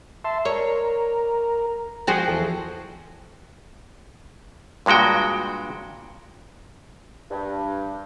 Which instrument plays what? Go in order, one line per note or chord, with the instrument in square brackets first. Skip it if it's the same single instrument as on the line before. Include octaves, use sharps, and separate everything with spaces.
[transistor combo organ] E5 A5 C6
[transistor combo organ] A#4 [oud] C#5
[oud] F3 F#4 G#4 [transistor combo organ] G5
[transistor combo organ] E2 A4
[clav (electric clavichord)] G2 A#2 G#3 F#4 G5
[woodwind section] G2